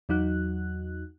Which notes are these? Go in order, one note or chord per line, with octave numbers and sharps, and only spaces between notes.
E2 F#3 D#4 F#4 F#6